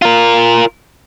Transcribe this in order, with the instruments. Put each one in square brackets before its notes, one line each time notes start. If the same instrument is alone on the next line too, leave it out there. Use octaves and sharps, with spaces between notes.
[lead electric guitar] F4 A#4